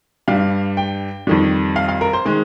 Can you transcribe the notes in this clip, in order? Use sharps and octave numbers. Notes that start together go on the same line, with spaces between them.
G2 G3 F5
G5
F2 D#3 G3
F5
F5
A#4
C5
D#3 G#3